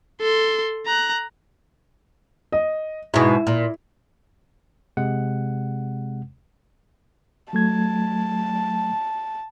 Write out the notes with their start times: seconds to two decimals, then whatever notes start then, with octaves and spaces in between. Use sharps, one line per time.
0.21 A4 C6
0.86 A#5 F#6
2.52 D#5
3.14 G#2 B2 E4
3.47 A#2
4.97 C3 G#3 F#5
7.53 F#3 A3 A5 G#6